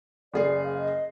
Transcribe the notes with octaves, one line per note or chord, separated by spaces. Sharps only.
F#1 G#4 D5 C7
F5
D#5